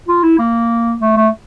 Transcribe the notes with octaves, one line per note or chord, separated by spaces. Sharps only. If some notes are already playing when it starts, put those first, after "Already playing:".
F4
E4
A#3
A3
A3